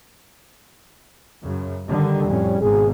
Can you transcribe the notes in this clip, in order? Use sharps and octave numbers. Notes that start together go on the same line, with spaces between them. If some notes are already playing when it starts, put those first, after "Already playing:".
F#2 C#3
D3 D#3 G3
F2 A2 C#4
G#1 G#2 B2 G#4